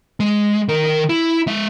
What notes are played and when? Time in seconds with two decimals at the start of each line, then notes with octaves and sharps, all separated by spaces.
0.20 G#3
0.68 D#3 A#4
1.09 E4
1.47 G#3 E5